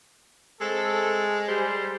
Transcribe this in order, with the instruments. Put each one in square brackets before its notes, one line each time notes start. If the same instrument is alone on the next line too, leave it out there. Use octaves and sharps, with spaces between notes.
[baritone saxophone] G#3 [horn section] A3 C4 A4
[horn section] G3 C5